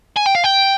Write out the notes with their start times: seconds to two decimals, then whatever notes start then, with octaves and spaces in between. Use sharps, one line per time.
0.17 G#5
0.27 G5
0.35 F5
0.44 G5